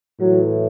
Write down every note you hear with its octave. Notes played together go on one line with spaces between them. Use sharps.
A2 E3 F#3